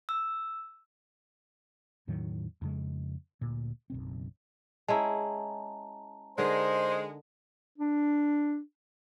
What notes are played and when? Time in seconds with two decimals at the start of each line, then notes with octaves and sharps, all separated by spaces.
0.09 E6
2.07 E2 A2 D#3 F#3
2.61 F2 C#3 G#3
3.41 D2 A#2
3.90 F#1 B1 C4
4.88 G#3 C#4 E4 A5 A#5
6.38 D3 G#3 D#4 A#4 C5
7.78 D4